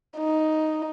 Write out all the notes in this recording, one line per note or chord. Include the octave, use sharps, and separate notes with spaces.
D#4